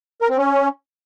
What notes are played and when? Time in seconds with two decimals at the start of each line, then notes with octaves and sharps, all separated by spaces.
0.21 A#4
0.30 C4
0.38 C#4